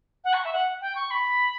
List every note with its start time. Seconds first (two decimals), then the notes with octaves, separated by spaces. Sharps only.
0.24 F#5
0.34 C#6
0.44 E5
0.53 F#5
0.81 G5
0.95 C#6
1.11 B5